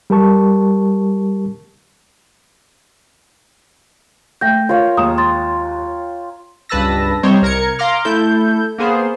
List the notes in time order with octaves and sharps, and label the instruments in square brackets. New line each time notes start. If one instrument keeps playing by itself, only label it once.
[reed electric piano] G3 G4 A#4 A5 C#6
[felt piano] A3 [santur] G5 [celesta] G6 A#6
[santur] F4 C#5 F5 [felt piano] A#4
[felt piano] D#2 G#3 E7 [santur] A#5 [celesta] D#6
[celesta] C6 A6
[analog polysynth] C#2 G2 B4 A5 E6 A#6
G3 C4 D#4 C5 C#5
C2 A#4 A#5 G#6 C#7
F5 A#5 C6 D6 F6
A3 E4 A4 G6
A#3 B3 G#4 C5